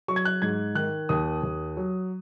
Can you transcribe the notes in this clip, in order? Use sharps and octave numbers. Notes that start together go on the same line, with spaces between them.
F#3 C#6
G#6
F#6
G#2 G#6
D#3 F#6
D#2 D#6
D#2
F#3